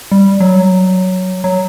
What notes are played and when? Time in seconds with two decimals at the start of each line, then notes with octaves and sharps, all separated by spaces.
0.12 G3
0.40 F#3
1.44 F#3